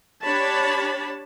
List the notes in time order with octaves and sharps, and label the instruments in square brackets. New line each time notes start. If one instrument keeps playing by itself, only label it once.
[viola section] D4 G4 C#5 A5 B5